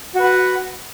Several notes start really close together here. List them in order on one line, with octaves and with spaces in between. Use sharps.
F#4 B4 F#5